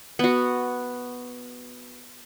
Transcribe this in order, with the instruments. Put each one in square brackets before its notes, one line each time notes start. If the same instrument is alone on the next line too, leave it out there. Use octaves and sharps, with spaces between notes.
[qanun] B3 F#4